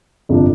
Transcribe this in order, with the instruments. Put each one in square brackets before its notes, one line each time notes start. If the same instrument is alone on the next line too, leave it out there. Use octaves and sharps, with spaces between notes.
[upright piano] G1 F2 C3 F3 D4